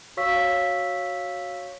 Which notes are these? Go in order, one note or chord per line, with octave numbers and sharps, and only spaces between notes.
F#4 C#5 F5 C#6 E6 B6